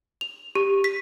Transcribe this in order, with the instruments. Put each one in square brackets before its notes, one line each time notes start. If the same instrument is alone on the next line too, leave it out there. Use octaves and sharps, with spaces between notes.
[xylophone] F7
G4
B6